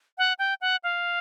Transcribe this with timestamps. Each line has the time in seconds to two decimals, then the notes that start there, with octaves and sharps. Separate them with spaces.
0.18 F#5
0.39 G5
0.61 F#5
0.84 F5